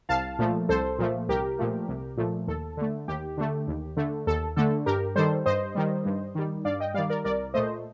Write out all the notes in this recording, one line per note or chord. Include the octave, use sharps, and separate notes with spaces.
C2 F5 A5
A#2 F3 A3
C2 A4 C5
A#2 F3 A3
C2 G4 A#4
A#2 F3 A3
C2
A#2 F3 A3
D#2 A4
D3 A3
D#2 G4
D3 A3
D#2
D3 A3
D#2 A4
D3 A3 A4
G2 G4 A#4
D#3 G3 A4 C5
G2 C5 D#5
D#3 G3
G2
D#3 G3
G2 D5 F5
D#5 G5
D#3 G3 D5 F5
A#4 D5
C2 A#4 D5
A#2 A3 C5 D#5